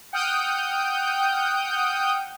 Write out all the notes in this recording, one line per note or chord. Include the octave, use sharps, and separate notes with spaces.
F#5 G5 D#6 F6 G6